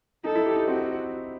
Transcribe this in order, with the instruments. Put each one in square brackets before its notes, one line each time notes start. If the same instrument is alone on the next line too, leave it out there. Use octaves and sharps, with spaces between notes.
[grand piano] D#4 [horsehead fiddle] A4
[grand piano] E4
G4
D#4
[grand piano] C4 [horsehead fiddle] F#4